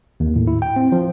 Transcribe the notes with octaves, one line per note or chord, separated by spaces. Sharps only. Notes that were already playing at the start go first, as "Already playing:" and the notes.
D#2
A2
E4
G5
C4
F3